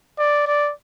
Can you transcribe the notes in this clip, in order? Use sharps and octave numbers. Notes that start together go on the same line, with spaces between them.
D5
D5